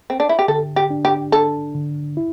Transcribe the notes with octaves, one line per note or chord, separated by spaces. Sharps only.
C4
D4
E4
G4
D3 A4
G4
D4
G4
D4 A4
D3
E4